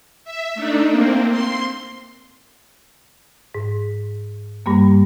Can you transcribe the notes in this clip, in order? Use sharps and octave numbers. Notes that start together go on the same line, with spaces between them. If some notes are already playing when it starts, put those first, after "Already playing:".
E5
A3 D4 D#4
A#3 C4
C6
G#2
G2 G3 A#3